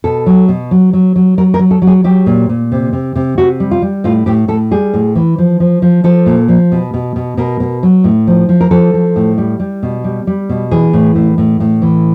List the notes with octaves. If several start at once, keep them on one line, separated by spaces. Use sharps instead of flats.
B2 A4
F#3
B2
F#3
F#3
F#3
F#3 A#4
A#4
F#3
A4
F#3
G#4
F#3 G4
A#2
A#2
C3
C3
C3
C3 F#4
G3
F4
G3
A2 F4
A2 G4
A2 A4
G3 G#4
A2
E3
F3
F3
F3
F3 A4
A#2
F3
B2
B2
B2
B2 A#4
B2
F#3
A2
F3
F3
A#4
F3 A4
F3
A2
G3
G3
B2
G3
G3
B2
E3 G#4
A2
A2
A2
A2
E3